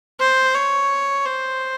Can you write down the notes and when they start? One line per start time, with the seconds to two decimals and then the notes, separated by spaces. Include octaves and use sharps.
0.20 C5
0.55 C#5
1.26 C5